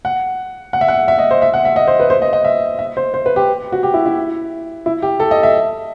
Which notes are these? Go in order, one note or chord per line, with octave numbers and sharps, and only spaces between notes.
F#5
F#5
E5
F#5
E5
D#5
C5
E5
F#5
E5
D#5
C5
B4
C5
D#5
D#5
E5
E5
C5
C5
B4
G4
F#4
G4
E4
E4
E4
G4
A4
D#5
E5